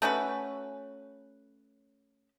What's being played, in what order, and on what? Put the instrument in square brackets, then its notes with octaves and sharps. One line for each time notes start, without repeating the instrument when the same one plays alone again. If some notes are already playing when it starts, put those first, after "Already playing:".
[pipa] A3 C#4 F#4 B4